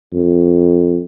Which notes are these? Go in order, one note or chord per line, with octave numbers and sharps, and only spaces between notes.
F2